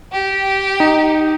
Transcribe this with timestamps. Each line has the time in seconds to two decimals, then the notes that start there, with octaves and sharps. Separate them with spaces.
0.13 G4
0.80 D#4